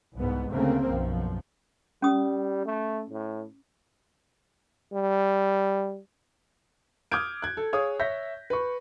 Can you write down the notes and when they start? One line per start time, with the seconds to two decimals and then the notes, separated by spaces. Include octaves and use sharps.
0.16 C2 G#2 B3
0.51 D2 C#3 A3 A#3 C4
0.87 B1 F#2 F3
2.02 G3 C#4 D#6
2.65 A3
3.10 A2
4.93 G3
7.12 D6 D#6 F6 G6 G#6 D7
7.42 F#6 G#6
7.57 A4
7.73 G#4 C#5 F5 D#6
7.99 C#5 E5 G6 A#6 B6
8.50 B4 C#6